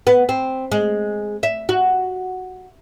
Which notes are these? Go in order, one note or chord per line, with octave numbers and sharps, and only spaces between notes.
B3
C4
G#3
E5
F#4